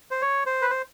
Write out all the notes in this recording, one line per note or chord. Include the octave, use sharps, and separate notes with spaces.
C5
C#5
C5
B4
C5